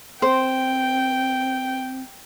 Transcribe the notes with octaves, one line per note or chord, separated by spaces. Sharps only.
C4 C5 G5